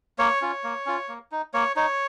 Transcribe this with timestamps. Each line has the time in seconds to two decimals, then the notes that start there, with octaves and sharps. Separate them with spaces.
0.19 A#3 C#5
0.41 C#4 F4
0.64 A#3
0.86 C#4 F4
1.08 A#3
1.32 D#4
1.54 A#3 C#5
1.76 D#4 C#5